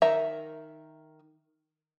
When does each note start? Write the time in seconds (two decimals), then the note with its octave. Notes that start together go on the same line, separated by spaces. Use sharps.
0.02 D#3 A#4 E5 A#5